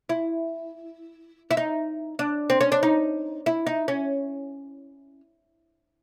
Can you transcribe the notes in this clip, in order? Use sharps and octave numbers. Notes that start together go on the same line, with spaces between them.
E4
E4
D#4
D4
C4
C#4
D4
D#4
E4
D#4
C#4